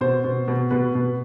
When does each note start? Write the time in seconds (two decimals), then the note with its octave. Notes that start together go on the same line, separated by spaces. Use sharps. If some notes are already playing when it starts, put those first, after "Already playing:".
0.01 B2 C5
0.24 B2
0.48 B2
0.71 B2 B4
0.95 B2